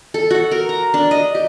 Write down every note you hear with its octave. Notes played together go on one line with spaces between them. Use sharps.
A4
F#4
A#4
A#5
D4
D#5
G4